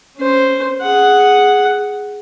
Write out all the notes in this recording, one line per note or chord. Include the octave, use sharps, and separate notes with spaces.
C#4 C5
G#4 F#5